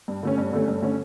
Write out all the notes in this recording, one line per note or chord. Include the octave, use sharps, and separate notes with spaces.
G2
D3 A3 C#4
G2
D3 A3 C#4
G2
D3 A3 C#4